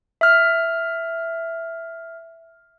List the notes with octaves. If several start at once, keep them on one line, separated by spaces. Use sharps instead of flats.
E5 F6